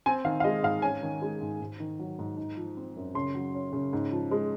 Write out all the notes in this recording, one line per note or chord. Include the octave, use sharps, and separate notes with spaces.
C4 G#5
D#3 F5
F5
G#3 D#5
G#2 F5
C#4 G#5
D#3
G#3
G#2
G#2
D#3
F#3
G#2
D#4
F3
C4
F#2
C#3 C6
F#3
C#4
C#3
G#2
F3
G#3